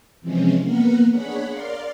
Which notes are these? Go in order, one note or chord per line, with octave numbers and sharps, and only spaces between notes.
C3 E3 F3 G#3 C4 C#4
A#3 B3 A#4 B4 F#5
D4 G#4 C#5 F#5 B5
A#4 D5 F5 C6